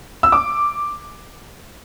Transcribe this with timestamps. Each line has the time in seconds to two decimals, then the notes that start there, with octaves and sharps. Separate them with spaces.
0.23 E6
0.32 D6